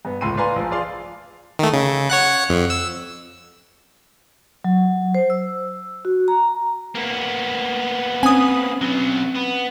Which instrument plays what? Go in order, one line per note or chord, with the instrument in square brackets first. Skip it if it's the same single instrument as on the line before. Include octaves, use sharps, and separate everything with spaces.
[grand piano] G2 B3
G1 C#2 A2 C6 D#7
B4 D5 F5 G#5 A#5 C6
A#1 F3
F4 G#4 D5 F5 C6
[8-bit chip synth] D#3 A3
C#3
C#5 F#5 F#6
F2
E6
[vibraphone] F#3
C5
E6
F#4
A#5
[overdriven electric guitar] A#3 B3
[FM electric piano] C4 C#4 [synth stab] G#5 D#6
[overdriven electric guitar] F#3 B3
B3